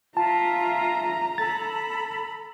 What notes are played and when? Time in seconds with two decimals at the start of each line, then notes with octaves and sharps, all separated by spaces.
0.17 F4 E5 A5 A#5
1.38 A4 B5 A6